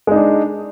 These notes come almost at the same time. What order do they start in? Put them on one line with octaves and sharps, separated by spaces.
G#3 D#4 D4